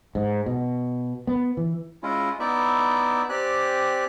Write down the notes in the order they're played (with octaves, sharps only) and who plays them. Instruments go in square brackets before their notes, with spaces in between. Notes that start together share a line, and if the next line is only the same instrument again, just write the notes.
[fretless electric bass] G#2
B2
B3
E3
[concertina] G#3 C#4 E4 F4
B3 D#4 E4 D5 E5
C4 G4 D5 G#5 F#6